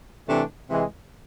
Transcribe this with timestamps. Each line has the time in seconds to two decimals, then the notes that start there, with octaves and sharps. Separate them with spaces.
0.28 C3 E3 A3 D4
0.70 C3 E3 G#3